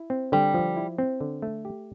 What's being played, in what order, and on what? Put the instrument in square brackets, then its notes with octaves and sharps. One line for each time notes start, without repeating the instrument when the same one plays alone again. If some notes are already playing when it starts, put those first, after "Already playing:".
Already playing: [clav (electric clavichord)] E4
C4
[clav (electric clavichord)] D3 [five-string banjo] G3
[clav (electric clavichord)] F3
E4
C4
D3
A3
G4